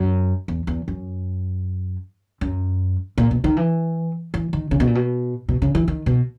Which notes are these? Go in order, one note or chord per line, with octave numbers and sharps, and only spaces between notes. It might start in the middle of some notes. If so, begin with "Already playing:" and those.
Already playing: F#2
E2
E2
F#2
F#2
A#2
B2
D#3
E3
E3
D#3
C#3
B2
A#2
B2
B2
C#3
E3
D#3
B2